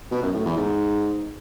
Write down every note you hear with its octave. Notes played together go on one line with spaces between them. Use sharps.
B2
F#2
A2
E2
G#2